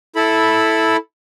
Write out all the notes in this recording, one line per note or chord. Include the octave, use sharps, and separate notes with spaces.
E4 A4 B5